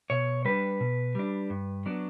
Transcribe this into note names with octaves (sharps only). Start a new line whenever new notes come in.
B2 C#5
G3 D4 B4
B2
G3 D4
G2
F#3 B3 D4